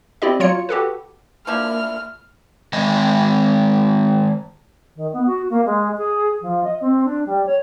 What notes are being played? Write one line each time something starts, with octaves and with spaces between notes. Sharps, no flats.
C4 E4 G4 D5 D#5
F#3 F4 C#5 C#7
F#4 G4 A4 B4
F3 A#3 D4 E4 F6
D#3 G#3 D#5
D#3
B3
F#4
A#3
G#3
G#4
F3
D#5
C4
D4
G3
C#5